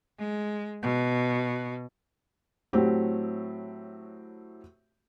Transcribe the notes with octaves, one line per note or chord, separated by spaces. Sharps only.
G#3
B2
A2 F#3 A3 C4 F#4 G4